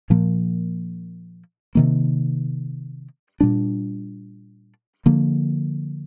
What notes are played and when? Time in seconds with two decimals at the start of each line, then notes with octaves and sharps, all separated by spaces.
0.10 A#2 F3 A#3
1.75 C3 D#3 A#3
3.41 A#2 G3 D4
5.06 D3 F3 A#3